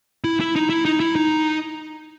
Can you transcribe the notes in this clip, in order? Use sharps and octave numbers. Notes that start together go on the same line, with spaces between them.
E4
E4
D#4
E4
D#4
E4
D#4